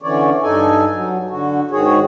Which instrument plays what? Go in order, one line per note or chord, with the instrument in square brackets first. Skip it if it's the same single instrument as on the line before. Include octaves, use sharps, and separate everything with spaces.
[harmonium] D3 E3 C#4 C#5 D5
G2 D#4 A4 G#5
F#3
D3 F#4
G#2 D#3 F#4 G#4 C#5